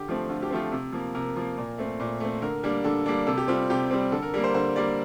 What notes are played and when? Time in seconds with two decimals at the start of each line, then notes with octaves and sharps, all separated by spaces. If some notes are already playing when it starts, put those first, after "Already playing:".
Already playing: D3 G4
0.08 F3 A3 C4
0.29 D3 F4
0.42 G4
0.51 F3 A3 C4 F4
0.72 C3
0.92 F3 A#3
1.14 C3 A#4
1.36 F3 A#3
1.57 A#2
1.78 A3 C4
2.00 A#2
2.20 A3 C4
2.42 D3 A#4
2.63 G3 A#3 D4
2.84 D3 A4
3.06 G3 A#3 D4
3.27 C3 A4
3.37 G4
3.48 G3 C4 F4
3.70 C3 G4
3.91 G3 C4
4.12 D3 A4
4.22 A#4
4.34 G3 A#3 A#4
4.44 C5
4.54 D3 C5
4.76 G3 A#3 D5